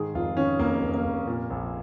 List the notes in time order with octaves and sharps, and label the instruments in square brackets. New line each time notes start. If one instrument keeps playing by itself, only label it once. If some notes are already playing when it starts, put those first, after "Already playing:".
Already playing: [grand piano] G#2 D#3 G#4
F1 F4
D#3 C#4
F1 A#3
F1
A#3
F1
A#2
A#1